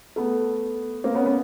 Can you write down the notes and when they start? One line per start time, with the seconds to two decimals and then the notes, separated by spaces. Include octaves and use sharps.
0.16 A3 B3
1.04 A#3 C4
1.14 B3 C#4
1.25 B3 C#4